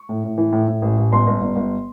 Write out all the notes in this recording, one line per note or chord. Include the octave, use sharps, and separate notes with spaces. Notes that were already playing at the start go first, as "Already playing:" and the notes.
Already playing: C#6
A2
A2
E3
A2
A2
A1
A1
G1 C6
G1
G1
G1